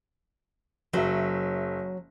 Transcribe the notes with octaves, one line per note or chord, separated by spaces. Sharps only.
F#1 F#3 C#5 E5